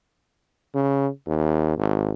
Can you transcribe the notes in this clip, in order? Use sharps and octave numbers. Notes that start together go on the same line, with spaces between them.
C#3
D#2
G#1